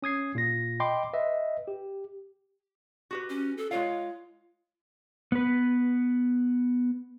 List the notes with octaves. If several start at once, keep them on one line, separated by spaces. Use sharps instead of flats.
C#4 D#6 G#6 C7
A#2 F4 A#6
D#5 G5 B5 C6 D6
B4 D#5 E5
G4
F#4 G4 B4
C#4
A4
G#3 F4 C#5 F5
B3 B4